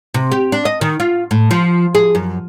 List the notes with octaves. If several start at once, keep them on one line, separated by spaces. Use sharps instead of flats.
C3
G4
D4
D#5
D#3
F4
A2
F3
G#4
F#2